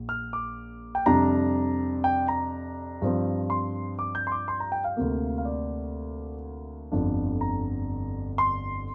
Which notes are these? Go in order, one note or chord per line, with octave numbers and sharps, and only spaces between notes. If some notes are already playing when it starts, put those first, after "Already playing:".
Already playing: A#1 A#2
F6
D6
G5
F2 C3 G3 D4 A#5
G5
A#5
G2 F3 C4
C6
D6
G6
C6
D6
C6
A#5
G5
F5
D2 C3 A#3
F5
D5
G1 F2 D3 F3 D4
A#5
C6